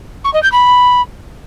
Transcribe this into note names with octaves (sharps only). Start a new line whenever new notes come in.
C#6
D#5
G6
B5